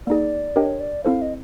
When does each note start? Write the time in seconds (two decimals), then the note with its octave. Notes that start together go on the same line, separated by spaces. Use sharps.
0.07 A#3 D#4 G#4 D5
0.56 D4 G4 A#4 C#5 D#5 G5
0.80 D5
1.05 C4 E4 A4 C5 F5
1.22 D#5